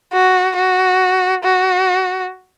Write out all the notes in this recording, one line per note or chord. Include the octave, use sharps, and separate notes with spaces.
F#4
F#4
F#4